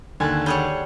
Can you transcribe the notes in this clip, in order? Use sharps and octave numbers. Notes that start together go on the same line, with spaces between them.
D#2 D3 G#5 A5 F#6
G3 G#4 A4 C#5 F#5